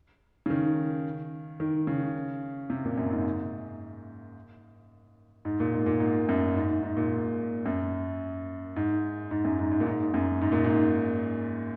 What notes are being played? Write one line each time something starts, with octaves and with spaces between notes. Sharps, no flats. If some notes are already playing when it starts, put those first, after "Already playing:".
C#3
D#3
D#3
C#3
C3
A#2
F#2
G#2
G#2
A#2
G#2
A#2
G#2
F#2
G#2
G#2
G#2
A#2
F#2
G#2
G#2
F#2
G#2
G#2
A#2
G#2
F#2
G#2
A#2
G#2